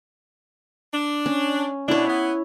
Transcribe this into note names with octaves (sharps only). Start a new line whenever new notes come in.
D4
C#4
B2 D4 E4 C#5
B3